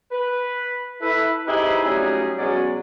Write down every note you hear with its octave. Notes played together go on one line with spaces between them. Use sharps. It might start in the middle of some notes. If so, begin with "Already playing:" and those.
B4
E4 A4 B4
C4 D#4 E4 G4 G#4 B4
A2 F#3 G3 C#4 D#4 G#4
B2 F#3 G#3 C#4 C#5 D5